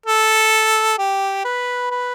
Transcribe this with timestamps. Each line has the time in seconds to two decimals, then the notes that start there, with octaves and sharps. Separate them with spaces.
0.06 A4
0.98 G4
1.44 B4
1.91 B4